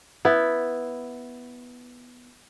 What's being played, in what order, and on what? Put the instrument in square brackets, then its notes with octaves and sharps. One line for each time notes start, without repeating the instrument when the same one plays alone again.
[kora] B3 E4